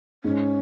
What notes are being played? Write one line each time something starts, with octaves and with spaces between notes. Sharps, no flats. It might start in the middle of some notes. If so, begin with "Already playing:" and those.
G#2 C#4